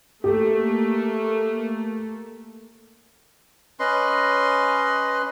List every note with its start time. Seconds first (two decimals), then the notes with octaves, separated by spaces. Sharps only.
0.24 A3 A#3 G4
3.80 C#4 B4 D#5 C6